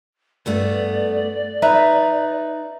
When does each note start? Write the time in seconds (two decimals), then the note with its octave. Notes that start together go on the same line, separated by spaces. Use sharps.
0.46 G2 A3 B3 D5
1.62 D#4 B4 E5 A#5